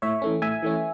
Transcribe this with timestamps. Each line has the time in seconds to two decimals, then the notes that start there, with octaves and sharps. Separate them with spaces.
0.02 A2 C#5 E5
0.22 E3 A3 C#4
0.42 A2 E5 G#5
0.63 E3 A3 C#4